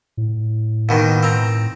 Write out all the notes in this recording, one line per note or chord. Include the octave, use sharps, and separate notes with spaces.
A2
D#2 B2 D#3
C4 A#5